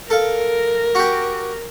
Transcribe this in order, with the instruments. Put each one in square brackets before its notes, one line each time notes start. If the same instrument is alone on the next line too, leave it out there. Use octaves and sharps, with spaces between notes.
[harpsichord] A4 F5 [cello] A#4
[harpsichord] F#4 G4